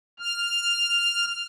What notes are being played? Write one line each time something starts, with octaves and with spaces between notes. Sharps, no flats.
F6